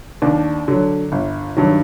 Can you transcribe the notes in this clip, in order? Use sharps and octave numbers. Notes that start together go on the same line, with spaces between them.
D#2 D4
D3 F#3
G1
G2 D#3 F#3